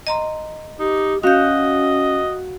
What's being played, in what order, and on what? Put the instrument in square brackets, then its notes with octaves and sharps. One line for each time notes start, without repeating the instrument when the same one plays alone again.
[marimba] D#5 A#5 C6
[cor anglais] D#4 [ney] G4
[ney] C#4 [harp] F#4 [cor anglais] D#5 [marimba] F5 G6